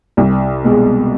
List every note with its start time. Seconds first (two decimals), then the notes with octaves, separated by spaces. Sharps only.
0.17 C2
0.64 B2 G#3